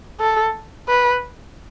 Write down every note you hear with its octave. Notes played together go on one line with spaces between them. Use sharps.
A4
B4